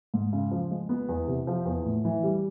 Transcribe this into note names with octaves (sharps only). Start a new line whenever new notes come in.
G#2
C#3
F3
G#3
B3
E2
C3
F3
E2
A2
E3
G3